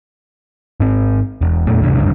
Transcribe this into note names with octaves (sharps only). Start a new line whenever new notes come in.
G#2 C4
E1
F2 A#2 A3
D2 G2 C3
F1 C#2 G2 D3